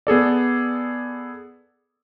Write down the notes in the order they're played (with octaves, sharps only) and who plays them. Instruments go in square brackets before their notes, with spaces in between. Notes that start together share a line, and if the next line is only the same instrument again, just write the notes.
[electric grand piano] B3 G#4 A4 D5